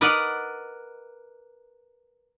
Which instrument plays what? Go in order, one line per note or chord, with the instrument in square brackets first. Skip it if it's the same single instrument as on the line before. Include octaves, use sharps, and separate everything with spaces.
[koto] A#4 B4 D5 D#5 F#5